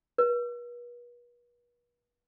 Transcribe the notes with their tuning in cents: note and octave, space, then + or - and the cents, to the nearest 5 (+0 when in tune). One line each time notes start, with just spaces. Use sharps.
B4 -40